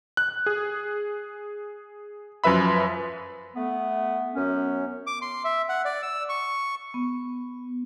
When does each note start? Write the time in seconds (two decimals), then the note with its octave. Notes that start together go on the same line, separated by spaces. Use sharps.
0.17 F#6
0.46 G#4
2.44 F#2 F3 B4 E5 B5
3.55 A3 B3
4.34 F#2 B3 C#4
5.07 D6
5.22 C6
5.45 E5
5.69 F#5
5.85 D5
6.02 E6
6.29 C#6
6.94 B3